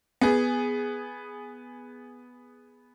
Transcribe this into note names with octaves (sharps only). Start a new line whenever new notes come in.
B3 G#4